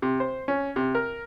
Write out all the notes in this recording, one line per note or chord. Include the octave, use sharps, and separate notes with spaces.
C3
C5
C#4
C3
A#4